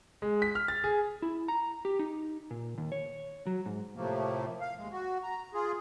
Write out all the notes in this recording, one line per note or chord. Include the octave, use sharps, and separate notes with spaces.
G#3
B6
F6
A6
G#4
E4
A#5
G4
D#4
A#2
D#2
C#5
F#3
G#2
A2 C3 F3 A3 A#3
F5
D#2 G#3
F#4
A#5
F4 G#4